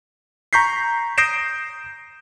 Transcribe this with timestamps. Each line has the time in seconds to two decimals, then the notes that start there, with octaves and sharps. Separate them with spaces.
0.53 A#5 C#6 G6 B6 C7
1.18 D#6 G6 A#6 C7 D7 E7